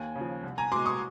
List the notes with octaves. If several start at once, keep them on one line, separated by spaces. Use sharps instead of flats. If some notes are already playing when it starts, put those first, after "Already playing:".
Already playing: D#2 G#5
C#3
F3
C2
G#5 A#5
B2 G#3 C6 D6
C#6 D#6